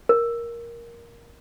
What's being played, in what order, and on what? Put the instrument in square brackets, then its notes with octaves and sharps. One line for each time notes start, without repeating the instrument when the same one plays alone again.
[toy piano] A#4